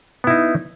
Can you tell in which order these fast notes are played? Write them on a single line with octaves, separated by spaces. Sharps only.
B3 E4 D#4